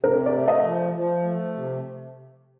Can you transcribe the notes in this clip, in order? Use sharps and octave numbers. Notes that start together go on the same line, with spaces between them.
C3 A#4
D5
A3
D#5
F3
F3
A3
C3